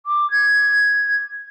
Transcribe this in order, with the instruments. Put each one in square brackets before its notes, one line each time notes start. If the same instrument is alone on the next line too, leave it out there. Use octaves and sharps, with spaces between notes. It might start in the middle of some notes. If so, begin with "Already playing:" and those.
[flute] D6
G#6